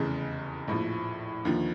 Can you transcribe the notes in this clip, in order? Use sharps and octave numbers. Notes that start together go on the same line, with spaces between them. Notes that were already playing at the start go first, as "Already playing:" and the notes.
Already playing: F1 E2 C#3
A#1 A2 F3
D#2 D3 F3